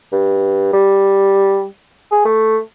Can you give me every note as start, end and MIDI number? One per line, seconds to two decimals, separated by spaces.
0.13 0.72 43
0.73 1.65 55
2.12 2.25 68
2.25 2.58 57